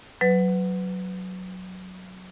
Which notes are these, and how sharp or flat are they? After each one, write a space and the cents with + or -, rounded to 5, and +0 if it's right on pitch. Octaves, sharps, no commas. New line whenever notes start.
F#3 +0 B4 +20